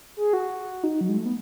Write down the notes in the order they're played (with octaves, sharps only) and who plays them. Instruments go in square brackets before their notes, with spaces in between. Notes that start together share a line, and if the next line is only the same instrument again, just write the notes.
[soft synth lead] G#4
F#4
D#4
F#3
G#3
A3
B3